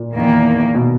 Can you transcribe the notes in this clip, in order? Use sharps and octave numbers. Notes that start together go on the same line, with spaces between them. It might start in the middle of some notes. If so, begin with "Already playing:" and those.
Already playing: A#2
E2 D#3 A#3
B2